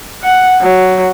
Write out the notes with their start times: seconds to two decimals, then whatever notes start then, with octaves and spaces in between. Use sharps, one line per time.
0.23 F#5
0.61 F#3